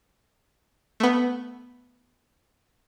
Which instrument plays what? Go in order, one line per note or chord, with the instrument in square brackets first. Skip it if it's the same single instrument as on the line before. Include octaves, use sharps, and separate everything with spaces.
[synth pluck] A3 B3